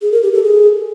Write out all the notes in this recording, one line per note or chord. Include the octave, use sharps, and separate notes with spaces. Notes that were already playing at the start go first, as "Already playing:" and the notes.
G#4
A#4
G4
A4
G#4